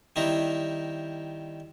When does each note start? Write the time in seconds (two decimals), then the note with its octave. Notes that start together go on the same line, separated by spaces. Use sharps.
0.16 D#3 G3 C4 E4 A#5